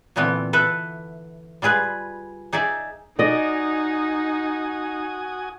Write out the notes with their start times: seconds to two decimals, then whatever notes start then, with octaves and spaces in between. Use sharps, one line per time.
0.16 A#2 D3 E3 B3 C4
0.53 A4 B4 E5
1.62 G3 F4 G#4 B4
2.53 D#4 G#4 D5 E5
3.19 D#4 F#4 D5 D#5 G#5 D#6